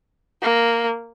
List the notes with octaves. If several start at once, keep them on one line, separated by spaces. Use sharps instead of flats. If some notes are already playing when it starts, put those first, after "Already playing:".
A#3